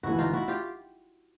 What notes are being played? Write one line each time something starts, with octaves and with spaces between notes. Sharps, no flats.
G1 G2 E3 A3 E4 F#4
D#4 F4
E4 F#4
F4 G4